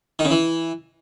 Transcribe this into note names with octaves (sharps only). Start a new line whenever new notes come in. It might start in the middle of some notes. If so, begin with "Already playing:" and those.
D#3
C#3
E3